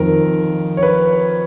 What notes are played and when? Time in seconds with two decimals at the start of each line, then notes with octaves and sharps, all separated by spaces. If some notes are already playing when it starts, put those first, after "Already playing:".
Already playing: F2 D#3 A#4
0.77 C#5
0.83 B4